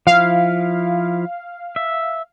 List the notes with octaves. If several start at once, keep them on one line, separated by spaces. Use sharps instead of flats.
F3 E4 F5
E5